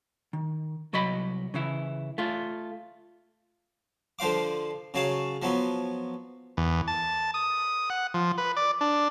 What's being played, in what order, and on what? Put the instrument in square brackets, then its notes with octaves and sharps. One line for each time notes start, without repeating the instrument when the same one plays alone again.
[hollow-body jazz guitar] D#3
C2 F#3 F#4 D#5 B5
C#3 E3 E4
A3 F4
[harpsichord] D3 F3 C5 F5 D6
C#3 F#3 F5 A5
F3 F#3 B3
[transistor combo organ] E2
A5
D#6
F#5
F3
B4
D5
D4